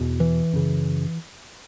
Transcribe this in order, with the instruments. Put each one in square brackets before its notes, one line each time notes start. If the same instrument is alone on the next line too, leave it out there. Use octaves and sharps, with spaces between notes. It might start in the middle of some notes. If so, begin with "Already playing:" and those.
Already playing: [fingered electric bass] E2 B2
E3
F#2 C#3